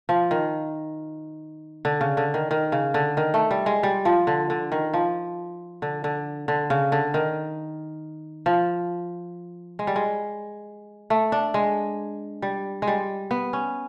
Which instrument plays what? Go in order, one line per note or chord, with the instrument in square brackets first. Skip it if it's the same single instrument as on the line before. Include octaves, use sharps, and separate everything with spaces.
[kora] F3
D#3
D3
C#3
D3
D#3
D#3
C#3
D3
D#3
A3
G3
G#3
G3
F3
D3
D3
D#3
F3
D3
D3
D3
C#3
D3
D#3
F3
G#3
G3
G#3
A3
D4
G#3
G3
G#3
G3
B3
C#4